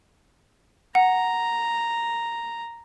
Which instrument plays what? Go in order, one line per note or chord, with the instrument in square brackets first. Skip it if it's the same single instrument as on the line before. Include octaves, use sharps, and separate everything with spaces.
[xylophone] F#5 [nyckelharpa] A#5